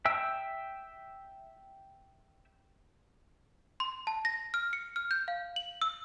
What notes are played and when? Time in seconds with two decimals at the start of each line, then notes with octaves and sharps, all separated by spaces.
0.05 E5 G5 E6
3.80 C6
4.07 A5
4.25 A#6
4.54 F6
4.73 C#7
4.96 F6
5.11 G6
5.28 F5
5.56 F#7
5.82 E6